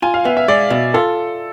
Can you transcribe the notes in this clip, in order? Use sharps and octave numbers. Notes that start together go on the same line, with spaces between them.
F4 G#5
F5
B3 E5
E5
G#3 D5
B2 E5
F4 A4